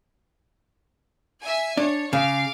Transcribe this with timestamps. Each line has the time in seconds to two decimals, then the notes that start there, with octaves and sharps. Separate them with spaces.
1.42 E5 G#5
1.77 D4 C#5
2.13 C#3 F5 D6